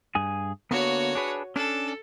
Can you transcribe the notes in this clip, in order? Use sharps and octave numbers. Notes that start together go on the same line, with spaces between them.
G2 G#4 G#5
D3 A#3 B3 F#4 C#5
D4 G#4 B4
C#4 D4 A4